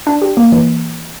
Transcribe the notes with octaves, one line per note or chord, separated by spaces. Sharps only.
D4
G4
A#3
E3